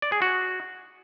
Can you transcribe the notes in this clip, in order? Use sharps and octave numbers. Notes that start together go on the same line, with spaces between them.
D5
G#4
F#4